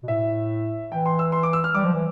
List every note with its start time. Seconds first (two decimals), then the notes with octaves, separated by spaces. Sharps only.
0.03 B2
0.08 A2 E5
0.91 E3 G5
1.06 C6
1.19 E6
1.32 C6
1.43 D6
1.53 E6
1.64 F6
1.75 G3 D6
1.85 F3
1.94 E3